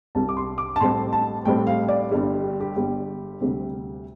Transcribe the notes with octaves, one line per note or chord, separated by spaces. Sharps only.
C2 C3 G3 A5
D6
C6
D6
A5
A1 A2 G3 C4 C6
A5
A1 A2 G3 C4 G5
F5
D5
G1 G2 G3
G4
G4
G1 G2 G3
D2 C3 G3 C4